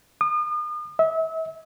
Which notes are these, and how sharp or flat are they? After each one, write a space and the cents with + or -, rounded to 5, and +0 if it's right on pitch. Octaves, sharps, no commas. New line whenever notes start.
D#6 -40
E5 -35